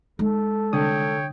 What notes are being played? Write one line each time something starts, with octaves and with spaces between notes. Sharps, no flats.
G#3 D#4 A4
C2 D3 C#5 G5 D#6